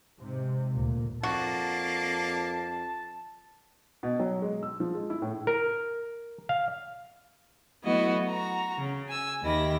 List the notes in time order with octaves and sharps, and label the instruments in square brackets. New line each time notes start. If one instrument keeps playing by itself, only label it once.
[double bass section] G#2 C3
D2 A#2
[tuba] F2 [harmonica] A#3 D4 [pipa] F#4 [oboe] A5
[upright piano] B2
F#3
G#3
E6
F3
G#3
E4
A2
[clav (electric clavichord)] A#4
F5
[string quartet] F#3 A3 B3 E4 F#4 D#5
F#4 A#5
C#3
G#5 E6
D#2 D#3 G4 E5 B5 A#6